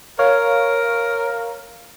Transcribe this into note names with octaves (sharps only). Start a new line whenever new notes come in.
A#4 C#5 F5